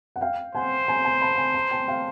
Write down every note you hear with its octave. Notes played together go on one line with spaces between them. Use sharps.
F#5
F5 G5
C5 F#5 G#5
G#5 A#5
G#5 A#5
A5 B5
G#5 A#5
G#5 A#5
G5 A5
F5 G5